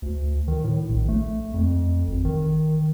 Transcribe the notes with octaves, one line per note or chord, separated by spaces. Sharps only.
D2
D#3
A2
A#1
A3
F2
G#1
D#3